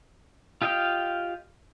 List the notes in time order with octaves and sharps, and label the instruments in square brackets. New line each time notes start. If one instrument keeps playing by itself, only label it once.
[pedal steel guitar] F4 G4 D#5 F5 G5